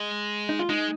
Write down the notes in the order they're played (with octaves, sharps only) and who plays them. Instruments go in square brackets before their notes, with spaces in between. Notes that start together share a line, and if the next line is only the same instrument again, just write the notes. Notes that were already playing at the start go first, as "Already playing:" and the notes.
Already playing: [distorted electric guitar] G#3
[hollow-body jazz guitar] D#4
F4
[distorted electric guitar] G#3 [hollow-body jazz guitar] D#4